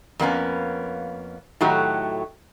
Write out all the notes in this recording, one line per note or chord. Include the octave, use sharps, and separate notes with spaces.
F2 A#3 B3 C#4
A2 D#3 F#3 A3 F#4 G4